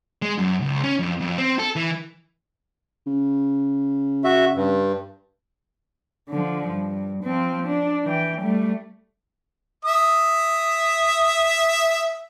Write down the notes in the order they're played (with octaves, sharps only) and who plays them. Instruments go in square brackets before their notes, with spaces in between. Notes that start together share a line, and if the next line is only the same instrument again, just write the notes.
[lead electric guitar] G#3
F#2
C#2
C#4
F2
F2
C4
A4
E3
[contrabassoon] C#3
[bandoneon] F#4 E5
G2
[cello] D3 F3
G2
F3 C4
D4
E3 G5
G3 A3
[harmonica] E5 D#6